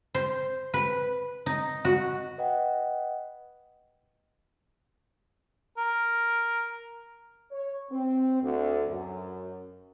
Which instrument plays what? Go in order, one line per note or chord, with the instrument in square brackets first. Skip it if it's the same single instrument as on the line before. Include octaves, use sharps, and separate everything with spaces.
[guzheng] C5
B4
D#4
F#4
[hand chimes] B4 D#5 F#5 G5
[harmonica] A#4
[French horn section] C#5
C4
D2
F#2